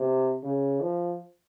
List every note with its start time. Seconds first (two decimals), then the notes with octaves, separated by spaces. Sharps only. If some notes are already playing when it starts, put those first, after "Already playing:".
Already playing: C3
0.43 C#3
0.81 F3